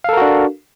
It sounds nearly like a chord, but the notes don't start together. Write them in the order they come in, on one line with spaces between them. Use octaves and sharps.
F5 A4 A#4 F#4 D4